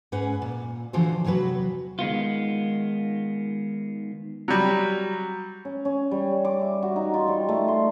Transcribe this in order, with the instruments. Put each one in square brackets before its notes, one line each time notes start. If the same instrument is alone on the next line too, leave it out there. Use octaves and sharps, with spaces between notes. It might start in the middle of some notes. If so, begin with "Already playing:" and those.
[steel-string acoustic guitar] G#2 C#4 B4 F#5
A#2
D3 E3 F3 F#4 A4 C5
E2 C3 F#3 F#4 B4
[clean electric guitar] D#3 G#3 B3 F4
[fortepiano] F#3 G3
[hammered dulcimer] C#4
C#4
G3
D6
E5
F#4
D#4
F4
G3
A3
C6